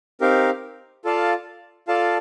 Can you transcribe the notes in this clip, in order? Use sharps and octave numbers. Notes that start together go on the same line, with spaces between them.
C4 D#4 G4 A#4 F5
F4 A4 D5 F5 A5
F4 A4 D5 F5 A5